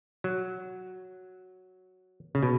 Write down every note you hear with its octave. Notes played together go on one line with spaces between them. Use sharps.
F#3
C#3
B2